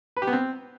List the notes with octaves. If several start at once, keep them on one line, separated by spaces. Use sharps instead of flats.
B4
G4
B3
C4